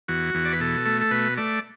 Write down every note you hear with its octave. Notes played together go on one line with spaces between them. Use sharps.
E2 F#4
E2
D5
B4
B2 A4
A3
A4
B2 B4
A3 D5